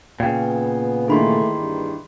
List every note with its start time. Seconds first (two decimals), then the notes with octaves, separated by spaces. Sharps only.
0.20 A#2 C#3 B3 G5
1.08 D#3 E3 A3 A#3 G#4 B5 C6
1.57 G2